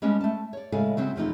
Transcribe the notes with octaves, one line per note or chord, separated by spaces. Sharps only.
G3 G#3 B3 C#4 D4
A3 A5
C#5 D5
A2 C#3 G#3 A4 F5 G#5
C#3 F#3 C4 E4
E2 B2 F3 A3 C4 D#4